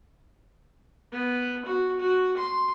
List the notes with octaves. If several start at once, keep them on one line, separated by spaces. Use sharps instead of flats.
B3
F#4
F#4
C6